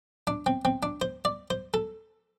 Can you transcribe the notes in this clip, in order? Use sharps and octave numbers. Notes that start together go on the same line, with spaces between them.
D4
C4
C4
D4
C5
D5
C5
A4